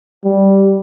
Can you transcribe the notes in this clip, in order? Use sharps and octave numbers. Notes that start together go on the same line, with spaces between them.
G3